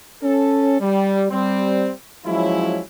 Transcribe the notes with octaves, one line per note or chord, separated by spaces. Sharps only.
C#4 A4
G3
G3 C4
F3 F#3 G#3 C#4 E4